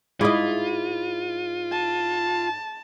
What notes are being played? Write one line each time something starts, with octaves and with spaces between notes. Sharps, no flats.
G#2 E4 F4 D#5
A5